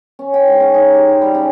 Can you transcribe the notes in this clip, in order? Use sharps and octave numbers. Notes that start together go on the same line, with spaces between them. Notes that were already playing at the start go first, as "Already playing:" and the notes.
C#4
G5
G#2
C#4
D#4
G4
C5
G3
C#3